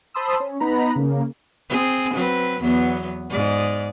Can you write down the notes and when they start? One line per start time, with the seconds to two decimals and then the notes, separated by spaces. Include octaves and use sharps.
0.14 C5 A5 B5 C6 D#6 E6
0.40 C#4
0.60 B3 D#4 B4 A#5 B5
0.96 C#3 A#3
1.69 C4 G#4
2.14 F#3 C4 B4
2.61 E2 F#3 B3
3.30 G#2 D5